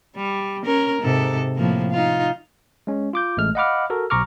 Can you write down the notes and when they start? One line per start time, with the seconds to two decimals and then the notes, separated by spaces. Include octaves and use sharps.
0.17 G3
0.65 C#4 A#4
1.00 G#2 C3 A4
1.56 A2 F3 A#3
1.90 D#4 F4
2.87 G#3 C#4
3.13 F4 D6 G6
3.37 A1 G#3 A3 F6
3.55 D#5 F5 F#5 B5 D6 F6
3.90 F#4 A4 A#4
4.10 B1 B2 A#5 C#6 D6 F6